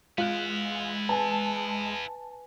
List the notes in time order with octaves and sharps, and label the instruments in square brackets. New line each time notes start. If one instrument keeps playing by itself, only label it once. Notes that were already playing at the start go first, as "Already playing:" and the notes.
[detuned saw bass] G#3 [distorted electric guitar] B3 E4 [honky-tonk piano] F4 F#6
[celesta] B4 G#5 [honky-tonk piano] A5